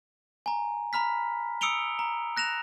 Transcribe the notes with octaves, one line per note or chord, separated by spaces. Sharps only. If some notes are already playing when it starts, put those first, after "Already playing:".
G#5 A#5
A#5 B5 F6 B6
D#6 E6 C#7 D7 F7 G7
A#5
F#6 A#6 E7 F7